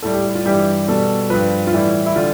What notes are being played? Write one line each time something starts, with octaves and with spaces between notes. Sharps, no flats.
A2 G3 A4
G4
E4
F4
G2 E3 G3 G4
B2 G3 A4
G2 F3 B4
F4
A2 E3 G3 E4
E4
D3 G3 F4